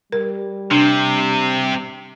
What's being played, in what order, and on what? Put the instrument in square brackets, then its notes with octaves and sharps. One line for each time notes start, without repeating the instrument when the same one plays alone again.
[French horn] G3 [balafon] A#4
[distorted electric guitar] C3 [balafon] D4